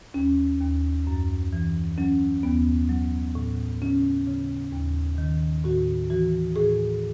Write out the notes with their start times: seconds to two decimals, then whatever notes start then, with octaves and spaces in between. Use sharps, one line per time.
0.14 D#2 C#4
0.61 D#2
1.07 F#2
1.53 E3
1.98 F#3 C#4
2.43 D#2 B3
2.89 F#3
3.35 A2
3.82 C#3 C#4
4.27 C#3
4.73 D#2
5.18 D#3
5.65 A2 F#4
6.10 E3 F#4
6.56 A2 G#4